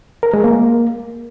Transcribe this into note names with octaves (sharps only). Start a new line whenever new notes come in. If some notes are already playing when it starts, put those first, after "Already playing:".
A#4
G#3
A#3